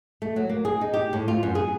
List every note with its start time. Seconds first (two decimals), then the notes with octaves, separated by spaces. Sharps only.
0.22 A3
0.36 F#3
0.49 A#3
0.65 G#4
0.81 D#4
0.93 G4
1.13 A2
1.28 F4
1.43 F#2
1.55 G#4